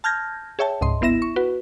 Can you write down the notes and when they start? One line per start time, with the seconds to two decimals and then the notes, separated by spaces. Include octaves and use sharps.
0.04 A5 F6 G6 G#6 A#6
0.59 G#4 C#5 E5 G5 A5
0.81 C#2 G#2 D#5 C6
1.01 G1 B3 E4 E5 A#6 E7
1.22 C#6
1.36 F#4 B4